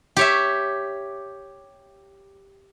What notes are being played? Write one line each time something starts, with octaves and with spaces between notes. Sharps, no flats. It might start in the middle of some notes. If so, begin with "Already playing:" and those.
G4 C#5 E5